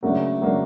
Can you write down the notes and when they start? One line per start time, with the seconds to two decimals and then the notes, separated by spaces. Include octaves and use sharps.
0.03 C#3 F#3 A3 A#3 D4
0.40 C#3 F#3 A#3 D4